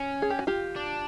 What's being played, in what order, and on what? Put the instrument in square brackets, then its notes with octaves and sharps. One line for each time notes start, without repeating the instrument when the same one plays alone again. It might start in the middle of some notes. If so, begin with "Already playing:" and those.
Already playing: [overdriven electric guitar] C#4
[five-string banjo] G#4
G4
F#4
F4 G4
[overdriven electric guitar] D4